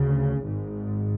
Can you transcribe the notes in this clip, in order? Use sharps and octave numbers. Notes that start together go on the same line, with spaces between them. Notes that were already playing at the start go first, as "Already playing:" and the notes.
Already playing: D2 C#3
G#1
G#2